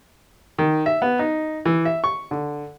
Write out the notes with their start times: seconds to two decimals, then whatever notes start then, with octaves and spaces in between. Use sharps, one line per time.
0.58 D#3
0.86 E5
1.02 B3
1.19 D#4
1.66 E3
1.85 E5
2.04 C#6
2.31 D3